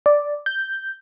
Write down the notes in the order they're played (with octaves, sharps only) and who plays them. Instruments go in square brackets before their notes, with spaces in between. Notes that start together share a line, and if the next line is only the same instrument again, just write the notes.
[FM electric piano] D5
G6